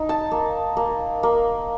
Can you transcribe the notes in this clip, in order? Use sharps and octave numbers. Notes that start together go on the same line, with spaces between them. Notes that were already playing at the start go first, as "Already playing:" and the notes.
Already playing: D#4
A5
A#3
A#3
A#3